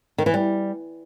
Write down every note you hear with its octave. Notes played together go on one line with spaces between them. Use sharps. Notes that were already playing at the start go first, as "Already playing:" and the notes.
D#3
E3
G3